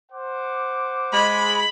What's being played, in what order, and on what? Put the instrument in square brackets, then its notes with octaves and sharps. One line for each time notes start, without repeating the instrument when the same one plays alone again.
[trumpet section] C5 F#5 D6
[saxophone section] G#3 [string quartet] B5